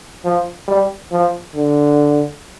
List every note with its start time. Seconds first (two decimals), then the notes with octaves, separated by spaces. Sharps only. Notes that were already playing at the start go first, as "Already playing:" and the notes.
0.25 F3
0.68 G3
1.12 F3
1.55 D3